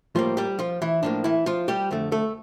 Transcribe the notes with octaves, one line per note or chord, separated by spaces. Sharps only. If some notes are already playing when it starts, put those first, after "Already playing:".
A2 F3 G3 A#3 F4
G3 G4
F3 F4
E3 E4
A2 F3 A#3 D4
E3 E4
F3 F4
G3 G4
F2 D3 A3
A3 A4